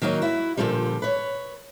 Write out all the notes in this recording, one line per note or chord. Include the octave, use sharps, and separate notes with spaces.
D#3 F#3 A#3 C#4 D#4
E4 F#4
A#2 D3 D#3 F3 G3
B4 C#5